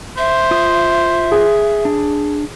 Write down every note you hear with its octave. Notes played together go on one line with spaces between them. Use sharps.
C5 E5
F4 D#6
G#4
D4